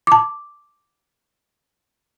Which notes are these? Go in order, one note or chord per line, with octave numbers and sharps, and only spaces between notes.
A5 D6